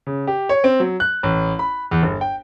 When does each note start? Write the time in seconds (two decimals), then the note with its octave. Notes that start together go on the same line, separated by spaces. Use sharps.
0.07 C#3
0.28 G4
0.49 C#5
0.64 C4
0.80 F#3
1.00 F#6
1.23 A1
1.59 B5
1.91 E2
2.03 G1
2.21 G5